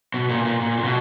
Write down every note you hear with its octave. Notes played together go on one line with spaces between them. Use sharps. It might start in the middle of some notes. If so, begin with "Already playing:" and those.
B2
A#2
A#2
A#2
A#2
B2